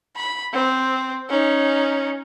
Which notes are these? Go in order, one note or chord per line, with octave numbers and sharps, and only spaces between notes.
B5
C4
C#4 D#4